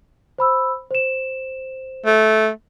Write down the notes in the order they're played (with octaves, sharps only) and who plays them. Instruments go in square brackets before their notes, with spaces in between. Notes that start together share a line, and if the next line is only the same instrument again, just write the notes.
[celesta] C5 B5 E6
C5 E7
[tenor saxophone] A3